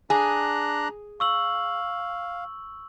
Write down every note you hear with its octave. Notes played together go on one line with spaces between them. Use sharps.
D4 G#4 A#5 F#6
F5 C#6 E6 F#7